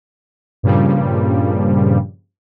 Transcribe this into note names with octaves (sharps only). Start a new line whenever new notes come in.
G2 A#2 C#3 F3 G3